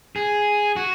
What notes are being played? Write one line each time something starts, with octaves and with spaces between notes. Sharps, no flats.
G#4
F#4